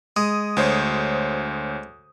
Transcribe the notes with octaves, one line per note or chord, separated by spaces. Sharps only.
G#3 D#6
D2 C5 C#5